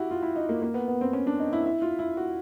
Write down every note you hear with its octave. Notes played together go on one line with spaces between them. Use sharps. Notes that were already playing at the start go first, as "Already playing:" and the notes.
Already playing: E4 F#4 G4
F4
E4
D#4
A#3
A#3
B3
B3
C4
C#4
D4
D#4
E4
E4
F4
E4
F#4